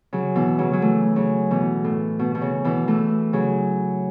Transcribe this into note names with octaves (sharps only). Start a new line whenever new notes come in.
C#3 F#3
B2 E3
C#3 F#3
F#3
E3 A3
C#3 F#3
B2 E3
A2
B2
B2
C#3
B2 E3
E3 A3
C#3 F#3